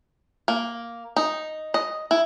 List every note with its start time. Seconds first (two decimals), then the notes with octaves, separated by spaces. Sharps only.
0.48 A#3
1.16 D#4
1.74 D#5
2.11 E4